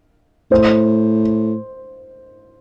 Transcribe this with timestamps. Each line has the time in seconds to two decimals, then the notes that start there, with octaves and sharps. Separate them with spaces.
0.51 A2 C5